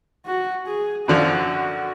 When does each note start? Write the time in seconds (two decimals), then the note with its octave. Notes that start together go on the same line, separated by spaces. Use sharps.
0.25 F#4
0.66 G#4
1.08 F#2 D3 F3 F#4